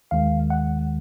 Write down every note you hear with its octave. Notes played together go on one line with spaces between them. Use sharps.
D#2 D#3 G#3 F5
F#5